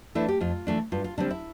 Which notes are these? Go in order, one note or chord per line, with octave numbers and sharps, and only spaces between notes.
E3 A3 D4 E4
G4
F2 F4
E3 A3 D4
G2 F4
F4
D3 G3 C4 D4
E4